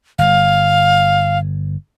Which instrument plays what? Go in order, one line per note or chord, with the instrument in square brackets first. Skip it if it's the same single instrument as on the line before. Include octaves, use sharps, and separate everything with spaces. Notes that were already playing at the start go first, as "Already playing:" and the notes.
[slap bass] G1 [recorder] F5